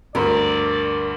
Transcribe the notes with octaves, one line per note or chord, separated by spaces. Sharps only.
D2 G2 A#4 D5